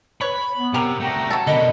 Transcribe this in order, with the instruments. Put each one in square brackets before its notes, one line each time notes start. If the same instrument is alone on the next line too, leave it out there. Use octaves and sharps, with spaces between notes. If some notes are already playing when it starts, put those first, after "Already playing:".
[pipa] B4 C#5 [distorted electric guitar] B5
[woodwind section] B3
[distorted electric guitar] C3 [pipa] G4 A#4
[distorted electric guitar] A3 F#4 [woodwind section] G5 A#5
[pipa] F#3 A4
[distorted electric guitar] B2 D3 [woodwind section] A#4 B5 [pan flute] D#5